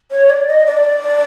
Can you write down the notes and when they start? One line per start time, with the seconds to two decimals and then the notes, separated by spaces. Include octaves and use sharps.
0.11 C#5
0.30 D5
0.48 D#5
0.66 D5